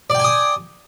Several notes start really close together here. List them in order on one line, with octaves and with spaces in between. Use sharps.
D5 G5 G#5 D#6